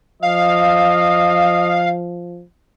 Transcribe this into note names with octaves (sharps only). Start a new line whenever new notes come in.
F3 D#5 F5